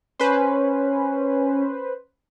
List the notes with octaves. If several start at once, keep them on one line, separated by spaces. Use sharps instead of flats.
C#4 B4 C5